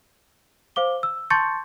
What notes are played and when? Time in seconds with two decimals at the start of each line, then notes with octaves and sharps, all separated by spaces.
0.76 C5 F5 D6 G7
1.03 E6
1.30 A5 C6 C#6 G6 A6 C#7